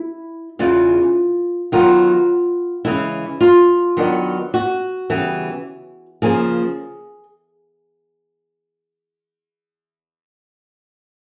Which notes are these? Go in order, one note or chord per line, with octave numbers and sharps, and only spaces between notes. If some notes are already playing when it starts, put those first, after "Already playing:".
Already playing: E4
E2 C#3 E3 F4
D#3 F#3 B3 F4
C#3 E3 G#3 E4
F4
D#3 F#3 B3 D4
F#4
C#3 E3 G3 B3
C#3 F3 A#3 G#4